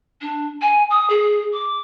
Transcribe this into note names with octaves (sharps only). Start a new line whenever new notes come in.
D4
G#5
D#6
G#4
D6